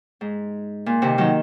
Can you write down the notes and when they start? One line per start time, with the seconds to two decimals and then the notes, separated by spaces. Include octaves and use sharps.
0.21 G#2
0.86 A#2
1.02 C3 D#3
1.18 D#3 F#3